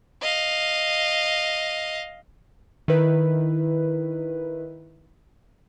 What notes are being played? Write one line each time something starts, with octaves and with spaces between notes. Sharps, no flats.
D#5 F5
D#3 E4 B4